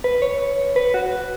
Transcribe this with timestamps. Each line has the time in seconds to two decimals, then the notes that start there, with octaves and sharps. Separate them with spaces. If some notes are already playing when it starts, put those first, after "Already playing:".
0.04 B4
0.22 C#5
0.76 B4
0.94 F#4